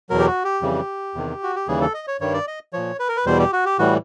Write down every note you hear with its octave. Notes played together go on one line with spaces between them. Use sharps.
E2 B2 F#3 A#4
G4
F#4
G4
F2 C#3 E3 G3
E2 C3 D#3
F#4
G4
D#2 C#3 E3 G3 G#4
A4
D#5
C#5
G2 D#3 G3 C#5
D5
D#5
A#2 F3 C#5
B4
A#4
B4
E2 B2 G3 C5
G4
F#4
G4
A2 E3 G3 F#4